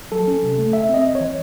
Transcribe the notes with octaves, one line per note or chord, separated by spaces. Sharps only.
F#3 A4
C#4
C3
A3
C#3 E5
C4
D#5
C#2
E3 C#5